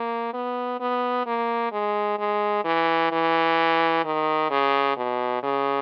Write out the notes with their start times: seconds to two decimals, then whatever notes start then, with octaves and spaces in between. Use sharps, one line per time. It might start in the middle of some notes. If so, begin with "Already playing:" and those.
Already playing: A#3
0.33 B3
0.80 B3
1.26 A#3
1.72 G#3
2.19 G#3
2.65 E3
3.12 E3
4.05 D#3
4.50 C#3
4.97 B2
5.43 C#3